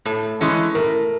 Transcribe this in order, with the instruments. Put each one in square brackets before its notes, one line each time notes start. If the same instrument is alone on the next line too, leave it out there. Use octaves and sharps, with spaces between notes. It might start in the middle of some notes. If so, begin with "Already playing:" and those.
[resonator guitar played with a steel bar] A2 [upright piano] A4
[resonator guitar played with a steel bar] E3 G#3 C#4
[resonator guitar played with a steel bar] A2 [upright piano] A#4